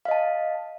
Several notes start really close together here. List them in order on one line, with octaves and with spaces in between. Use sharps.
F5 D#5 A5